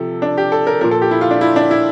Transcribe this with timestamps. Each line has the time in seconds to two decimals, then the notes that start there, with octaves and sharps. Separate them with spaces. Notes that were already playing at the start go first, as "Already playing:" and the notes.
Already playing: C3 F3 A4
0.22 D4
0.37 G4
0.52 A4
0.67 A#4
0.81 A#2 F3 A#4
0.91 A4
1.02 G4
1.11 E4
1.21 F4
1.31 D4
1.41 E4
1.56 D4
1.71 E4